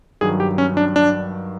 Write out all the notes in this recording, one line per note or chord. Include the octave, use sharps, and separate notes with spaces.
G2 D#3 F#3 G#4
G4
C#4
D4
D4